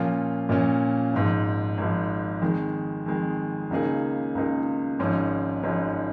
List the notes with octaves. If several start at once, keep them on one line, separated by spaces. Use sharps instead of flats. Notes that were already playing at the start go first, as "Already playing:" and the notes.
Already playing: A#2 F3 A#3 C#4 F4
A#2 F3 A#3 C#4 F4
G#1 G#2 F3
G#1 G#2 F3
F2 D#3 G#3
F2 D#3 G#3
C#2 C#3 A#3 D#4 G#4
C#2 C#3 A#3 D#4 G#4
G#1 G#2 F3 C#4
G#1 G#2 F3 C#4